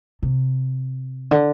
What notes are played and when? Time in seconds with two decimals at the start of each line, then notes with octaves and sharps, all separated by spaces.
0.23 C3
1.31 D3